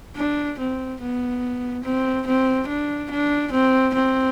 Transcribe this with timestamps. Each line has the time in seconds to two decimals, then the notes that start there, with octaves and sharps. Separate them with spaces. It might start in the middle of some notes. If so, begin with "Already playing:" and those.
0.16 D4
0.59 C4
1.01 B3
1.84 C4
2.26 C4
2.68 D4
3.11 D4
3.52 C4
3.94 C4